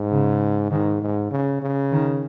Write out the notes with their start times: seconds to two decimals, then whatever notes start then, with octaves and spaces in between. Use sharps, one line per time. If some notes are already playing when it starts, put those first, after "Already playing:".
Already playing: G#2
0.11 C#3
0.71 G#2 D#3
1.02 G#2
1.31 C#3
1.62 C#3
1.92 D#3